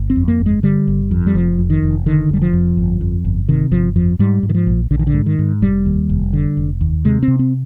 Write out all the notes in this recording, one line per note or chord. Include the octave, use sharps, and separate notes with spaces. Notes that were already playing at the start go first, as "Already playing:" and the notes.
Already playing: G1
C4
F2
A#3
G1
G#3
D3 G3
G1
F2
G3
F1 F3
F2
D#3
F1
D3 D#3
F1 G3
F3
F2
G1
F2
G1
C3 D#3
G1 F3
F2 F3
G#2 G3
G#2
D#3
F3
A#1
A#1 D3
D#3
D3
G#2
D#3
G#2
F1 G3
D#2
F1
D3
F1
D#2
C3 G#3
C4
C3
C4